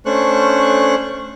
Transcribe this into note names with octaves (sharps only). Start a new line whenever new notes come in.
A3 C#4 D4 C5 C#6 F#6